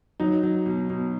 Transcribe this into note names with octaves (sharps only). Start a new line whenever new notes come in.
F#3 D#4
F#3
B2
B2